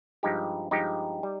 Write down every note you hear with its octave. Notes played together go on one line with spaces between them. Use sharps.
G2 F3 G#3 D#4 G4
G2 F3 G#3 D#4 G4
G3